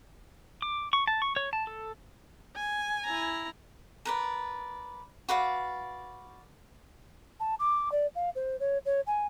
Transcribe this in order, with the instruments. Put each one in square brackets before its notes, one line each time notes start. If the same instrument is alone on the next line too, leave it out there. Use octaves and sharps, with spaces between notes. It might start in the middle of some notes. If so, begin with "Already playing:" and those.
[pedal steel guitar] D6
C#6
A5
C#6
C#5
A5
A4
[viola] G#5
[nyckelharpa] E4 A#5
[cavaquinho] A#4 B4 D5
F#4 B4 D5 F5
[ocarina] A5
D6
D5
F5
C5
C#5
C#5
G#5